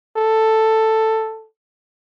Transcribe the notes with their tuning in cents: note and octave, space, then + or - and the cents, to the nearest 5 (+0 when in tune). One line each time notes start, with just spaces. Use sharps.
A4 +5